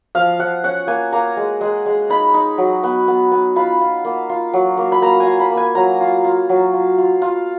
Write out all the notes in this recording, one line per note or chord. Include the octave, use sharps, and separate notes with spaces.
F3 F5
F3 F#5
C#4 F#5
A#3 G#5
A#3 A#5
G#3
G#3
G#3
D#4 B5
D#4
F#3
B3
B3
B3
F4 B5
F4
A#3
F4
F#3
A#3
B5
A#3 A#5
G#5
F4
B5
A#3
G#5
F#3 A#5
F4
F4
F#3
F4
F4
F4